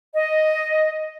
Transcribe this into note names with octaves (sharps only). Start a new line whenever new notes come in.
D#5